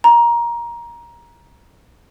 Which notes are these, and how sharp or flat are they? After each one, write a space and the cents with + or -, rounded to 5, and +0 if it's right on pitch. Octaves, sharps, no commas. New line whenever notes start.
A#5 +15